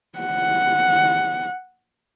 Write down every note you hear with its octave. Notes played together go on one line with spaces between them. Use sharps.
F#5